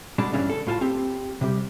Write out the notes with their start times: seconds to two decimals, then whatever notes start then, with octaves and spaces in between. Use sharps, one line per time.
0.18 B2 G#3 D4
0.33 G2 C#3 E3 G3 C#4 D4
0.50 A4
0.67 A2 F4 A5
0.81 C4 G4
1.41 C3 G3 G4